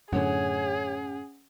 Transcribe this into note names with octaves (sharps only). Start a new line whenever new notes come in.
F#2 A2 D3 C#4 G#4 C#5 F#5